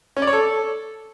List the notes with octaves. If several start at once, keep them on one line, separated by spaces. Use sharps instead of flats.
C#4
D5
C#5
A4